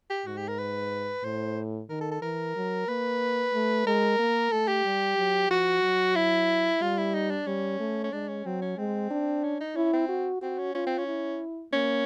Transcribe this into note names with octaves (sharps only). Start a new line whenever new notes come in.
G4
G#2 F#4
G4
A#4
B4
A2 C5
D#3 A#4
A4
A4
E3 A#4
F#3
A#3 B4
A3
G#3 A#4
A#3
A3 A4
G4
G3
F#3
F3 F#4
F#3
E4
G3 F4
E4
D#4
D4
G3 C#4
A3
C#4
G#3 D4
C#4
F#3 C4
C#4
G#3 C4
D4
C#4
D#4
C#4 E4
C4
F#4
C4 F#4
C#4
C#4 F4
C4
C#4
E4
A#3 C#4